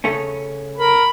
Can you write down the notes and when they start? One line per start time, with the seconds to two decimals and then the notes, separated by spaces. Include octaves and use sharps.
0.04 C#3 A3 C#4
0.78 A#4 B5